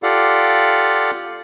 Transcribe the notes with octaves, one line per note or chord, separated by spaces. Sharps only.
F4 G4 A4 D5 F5 F#5